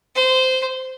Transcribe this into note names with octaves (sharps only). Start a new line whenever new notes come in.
C5